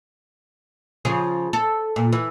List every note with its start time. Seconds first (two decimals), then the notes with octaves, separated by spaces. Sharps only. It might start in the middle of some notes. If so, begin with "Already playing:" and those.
1.05 C#3 F3 G#4
1.53 A4
1.96 A#2
2.13 E3